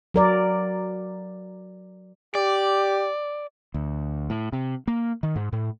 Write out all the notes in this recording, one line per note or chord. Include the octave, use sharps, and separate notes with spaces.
F#3 A#4 D5
G4 D5
D2
A2
C3
A#3
D#3
G#2
A2